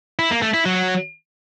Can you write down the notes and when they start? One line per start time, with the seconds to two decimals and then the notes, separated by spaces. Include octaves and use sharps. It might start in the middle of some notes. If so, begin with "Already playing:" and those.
0.19 E4
0.31 A#3
0.42 A3
0.54 E4
0.65 F#3